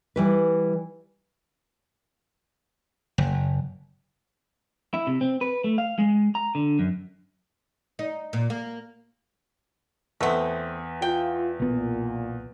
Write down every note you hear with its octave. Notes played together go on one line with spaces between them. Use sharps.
E3 G3 B4
F#1
E4
C3
C4
B4
A3
F5
G#3
A#5
D3
F#2
D#4
A#2
A#3
E2 A3 B3 C4 E5
F4 G5
B1 A#2 B3